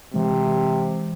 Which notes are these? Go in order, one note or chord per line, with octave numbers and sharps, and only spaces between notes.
C3 E3 G#3